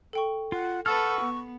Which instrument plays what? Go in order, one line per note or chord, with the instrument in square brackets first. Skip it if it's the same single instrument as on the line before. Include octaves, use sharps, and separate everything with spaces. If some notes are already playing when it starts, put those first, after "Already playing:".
[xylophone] A4 G5 C#6
[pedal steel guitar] F4 [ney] F#5
[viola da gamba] A4 B4 [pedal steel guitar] F#5 E6 F6 [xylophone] A5 A6 [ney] C#6
[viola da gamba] B3